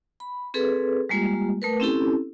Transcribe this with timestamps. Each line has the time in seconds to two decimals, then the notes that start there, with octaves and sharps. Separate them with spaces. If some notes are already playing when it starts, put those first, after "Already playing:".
0.20 B5
0.54 C4 G#4 A4 B4
1.09 G3 G#3 A#3 F4 G4
1.62 A3 A#4 B4
1.80 C4 C#4 E4 G4 A4